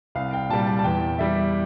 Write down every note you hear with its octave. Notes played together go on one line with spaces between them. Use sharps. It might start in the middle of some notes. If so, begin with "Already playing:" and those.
C2 F5
G5
A#2 G3 A5
A5
A5
E2 G5
E3 G3 E5